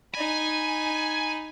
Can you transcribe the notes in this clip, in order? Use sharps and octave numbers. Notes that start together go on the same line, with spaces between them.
D#4 G#5 B5